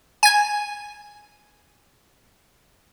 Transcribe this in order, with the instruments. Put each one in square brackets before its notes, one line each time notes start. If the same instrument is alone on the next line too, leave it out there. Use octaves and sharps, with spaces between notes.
[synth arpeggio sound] G#5 G#6